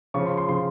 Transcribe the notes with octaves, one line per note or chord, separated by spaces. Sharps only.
C#3 F3 C#6
C6
C6
C#3 F3 C6